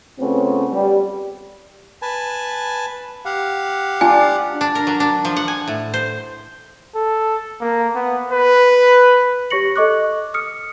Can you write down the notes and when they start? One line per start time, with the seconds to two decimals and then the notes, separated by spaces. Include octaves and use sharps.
0.20 C#3 A3 B3 C4 F4 C#5
0.73 G3
2.02 B4 G#5 A5
3.25 G4 F5 F#5
4.01 D4 F4 G#5
4.61 D4
4.75 A#4
4.87 F#3
5.00 D4
5.25 F3
5.37 F#5
5.48 G#5
5.68 A2
5.94 C5
6.95 A4
7.61 A#3
7.95 B3
8.32 B4
9.50 G4 C#5 C#6 A#6 C#7 F#7
9.76 A4 D#5 C#6 D6 F#6
10.34 D#6 F6 C#7